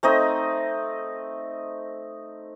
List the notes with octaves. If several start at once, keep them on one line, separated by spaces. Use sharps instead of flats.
A3 C4 D#4 D#5